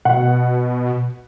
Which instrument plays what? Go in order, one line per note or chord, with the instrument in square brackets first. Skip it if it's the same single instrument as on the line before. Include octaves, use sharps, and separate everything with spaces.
[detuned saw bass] B2 [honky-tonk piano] F#5